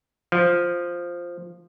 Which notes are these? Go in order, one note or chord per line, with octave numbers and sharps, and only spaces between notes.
F3